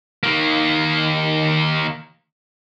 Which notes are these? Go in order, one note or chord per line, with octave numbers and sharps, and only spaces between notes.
D#3 A#3